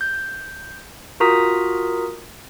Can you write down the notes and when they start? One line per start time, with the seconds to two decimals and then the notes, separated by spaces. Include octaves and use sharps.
0.01 G6
1.20 F4 F#4 A#4 A#5 D#6 B6